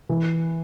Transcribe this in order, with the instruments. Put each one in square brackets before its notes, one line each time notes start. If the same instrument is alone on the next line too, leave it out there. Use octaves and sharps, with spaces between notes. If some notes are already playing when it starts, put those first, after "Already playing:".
[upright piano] E3